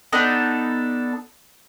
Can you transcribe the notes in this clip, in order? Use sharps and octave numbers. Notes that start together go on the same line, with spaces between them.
B3 D4 D#4 A4